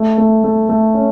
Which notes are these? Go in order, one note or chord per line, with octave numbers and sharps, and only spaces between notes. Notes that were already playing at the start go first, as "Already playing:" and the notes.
Already playing: A3
A3
A3
A3
C#4